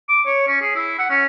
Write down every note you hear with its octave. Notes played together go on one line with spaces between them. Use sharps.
D6
C#5
C#4
G#4
E4
F#5
C#4